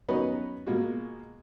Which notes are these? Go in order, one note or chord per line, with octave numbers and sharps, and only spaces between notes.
F#3 B3 C#4 D#4 B4 D#5
B2 G#3 A#3 F4 F#4